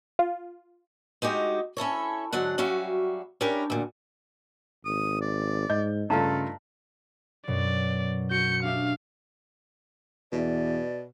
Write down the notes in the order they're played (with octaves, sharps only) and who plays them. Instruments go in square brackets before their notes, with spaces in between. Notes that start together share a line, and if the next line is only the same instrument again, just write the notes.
[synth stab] F4
[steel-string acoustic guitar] G#3 D#4 F#4 G4
C#4 E4 A4 C#5
G#2 D3 F#3 D4 F#5
F#3 G3 C#4 F#4 E5 F5
C#4 D4 E4 G4 A#4
D2 A#2
[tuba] G#1 [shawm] D#6
[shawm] D5
[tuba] G#2 [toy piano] D#5 [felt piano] G6
[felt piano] G2 A3 F4 [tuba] C#3 [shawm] A4 [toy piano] F5 A5 A#5
[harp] F#2 B2 F#3 [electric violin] D5
[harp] F#4 [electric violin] G6 C#7
[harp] D4 G4 E5 [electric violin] F5
[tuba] E2 [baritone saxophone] B2 [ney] D5